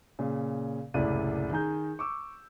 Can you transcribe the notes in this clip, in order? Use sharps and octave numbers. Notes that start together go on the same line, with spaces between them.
A#2 C#3
F#1 C2 A2 E4 D5 D#7
D#3 G#4 A#5 G6
C#6 D6 E6